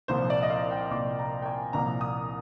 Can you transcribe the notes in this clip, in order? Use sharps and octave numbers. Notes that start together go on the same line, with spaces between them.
C2 A#2 F3 C5
D5
D#5
F5
G5
C2 A#2 F3 D6
A#5
G5
G#5
C2 A#2 F3 A#5
D#6